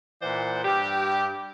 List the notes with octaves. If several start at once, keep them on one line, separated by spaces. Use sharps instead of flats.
A#2 E3 C5 D5 F#5
G2 G3 G4